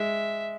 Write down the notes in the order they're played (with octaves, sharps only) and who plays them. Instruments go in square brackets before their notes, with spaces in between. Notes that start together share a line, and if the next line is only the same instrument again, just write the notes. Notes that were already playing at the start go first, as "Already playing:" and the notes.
Already playing: [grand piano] G#3 [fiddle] E5